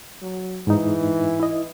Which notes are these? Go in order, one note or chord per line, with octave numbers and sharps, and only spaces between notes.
F#3
G#2 E3 D#4
E4 D#5